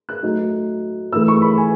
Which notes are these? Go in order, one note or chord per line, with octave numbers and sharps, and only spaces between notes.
F#6
A2 F#3 A3 D#4
A2 E3 A3 E6
C#6
B5
G#5